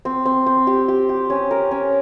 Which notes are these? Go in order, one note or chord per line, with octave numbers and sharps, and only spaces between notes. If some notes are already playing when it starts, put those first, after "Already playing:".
C4
C4
C4
G4
G4
G4
C#4
A#4
C#4